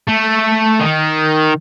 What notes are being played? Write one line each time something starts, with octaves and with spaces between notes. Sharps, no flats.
A3
D#3